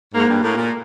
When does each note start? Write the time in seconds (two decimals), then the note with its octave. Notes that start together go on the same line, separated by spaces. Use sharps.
0.14 G#2 A#3
0.28 G2
0.42 A2 A#3
0.57 A#2